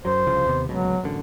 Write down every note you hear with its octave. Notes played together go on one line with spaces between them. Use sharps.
F#2 F#3 C5
C2 C#3 F3
D#2 C3 B3
D1 C#2 B2 F#3
A1 F#2 D3